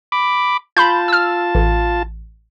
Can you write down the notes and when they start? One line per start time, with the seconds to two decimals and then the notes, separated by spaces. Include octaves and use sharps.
0.12 B5 D6
0.77 F4 A5 B5 C6 G6
1.08 E6 F6
1.55 A1